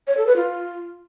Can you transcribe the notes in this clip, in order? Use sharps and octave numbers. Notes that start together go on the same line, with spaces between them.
C#5
A4
B4
F4